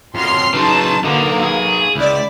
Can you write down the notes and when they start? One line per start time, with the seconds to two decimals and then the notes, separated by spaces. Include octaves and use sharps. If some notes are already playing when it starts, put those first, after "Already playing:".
0.15 F2 F#3 C6 F6 C7
0.54 C#3 F#3 D#4 B4 A5 C6
1.04 D3 A#3 D#4 F#4 B4
1.43 G#4
1.95 C#2 E4 D5